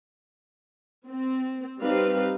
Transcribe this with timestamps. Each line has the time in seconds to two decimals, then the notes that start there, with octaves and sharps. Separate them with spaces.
1.08 C4
1.80 G3 C4 D#4 G4 B4 F5